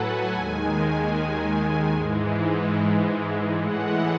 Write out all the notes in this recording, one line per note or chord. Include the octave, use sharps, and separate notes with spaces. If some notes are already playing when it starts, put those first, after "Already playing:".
Already playing: A2 F#3 A4 B4 F#5 G#5
D#2 D#3 G#3
G#2 E3 G#3
A2 E3 G#3 F#5